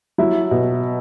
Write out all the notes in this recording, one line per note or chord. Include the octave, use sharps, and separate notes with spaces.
F#3 E4
B2